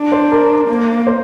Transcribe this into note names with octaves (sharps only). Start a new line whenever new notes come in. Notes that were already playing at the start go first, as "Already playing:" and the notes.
Already playing: D4
C5
A#4
A#3
C5